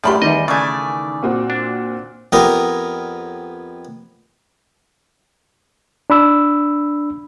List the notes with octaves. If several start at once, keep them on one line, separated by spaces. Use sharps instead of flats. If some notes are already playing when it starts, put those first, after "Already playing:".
F#2 A2 F3 A3 G4 D5 B5 C6
E2 D#3 G3 D#5
C#3 E3 A3 D5 G#5
A#2 C4 F#4
D4
F2 B3 G4 A#4 D#6
D4 B5 E6